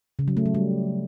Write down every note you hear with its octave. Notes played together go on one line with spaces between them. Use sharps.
C#3
F#3
A3
F#3
G3